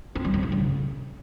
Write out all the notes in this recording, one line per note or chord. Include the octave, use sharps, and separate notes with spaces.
C4
G3
C4
D4
C#3